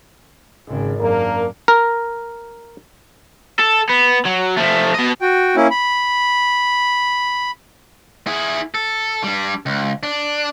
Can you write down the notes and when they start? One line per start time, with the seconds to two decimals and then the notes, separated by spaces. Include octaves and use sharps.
0.68 G#1 C#3
1.00 F#2 A#3 D4 A#4
1.68 A#4
3.60 A4
3.90 B3
4.26 F#3
4.58 F3 A3
4.95 B2 D#5
5.20 F#4 G5
5.56 A#3 C#4 E4
5.71 B5
8.27 E4 G#4
8.74 A4
9.24 G3 D4
9.66 C#2
10.03 D4